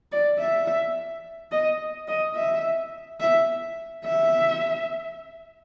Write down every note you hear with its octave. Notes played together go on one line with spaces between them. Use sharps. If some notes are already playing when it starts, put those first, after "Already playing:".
D5
E5
D#5
D#5
E5
E5
E5